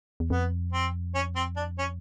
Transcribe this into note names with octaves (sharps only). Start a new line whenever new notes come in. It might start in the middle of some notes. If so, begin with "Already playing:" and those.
E2
F2 B3
C4
C#4
C4
D4
C#4